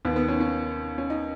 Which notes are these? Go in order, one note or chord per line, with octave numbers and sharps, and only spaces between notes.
D#2 D#3 B3
B3
C#4
C#4
C#4
D#4